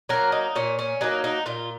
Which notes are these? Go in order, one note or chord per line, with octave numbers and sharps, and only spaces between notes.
F#3 A#3 A#4
D#4
A#2 C#4
C#4
F#3 A#3 D#4
D#4
A#2 F4